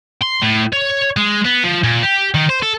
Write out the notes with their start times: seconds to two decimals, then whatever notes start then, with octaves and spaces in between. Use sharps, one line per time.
0.22 C6
0.42 A2
0.73 C#5
1.17 G#3
1.45 B3
1.64 F3
1.84 A#2
2.03 G4
2.34 D#3
2.49 C5
2.63 A4